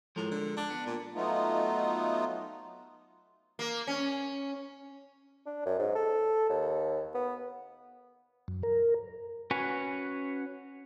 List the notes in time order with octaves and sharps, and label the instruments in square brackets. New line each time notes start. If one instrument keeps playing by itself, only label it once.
[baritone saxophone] A2 [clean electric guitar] F3 G#3 A#4
[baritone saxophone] D3
D4
[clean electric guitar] B3
[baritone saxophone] A#2
[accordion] F#3 A3 B3 D#4 F4
[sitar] A#3
C#4
[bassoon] D4
F#2
G#2
A4
D#2
B3
[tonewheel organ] F#2
A#4
[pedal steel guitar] C#4 F#4 B4 C#5 G#5